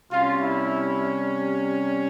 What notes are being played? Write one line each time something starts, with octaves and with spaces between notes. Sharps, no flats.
C3 G3 C#4 F4
E4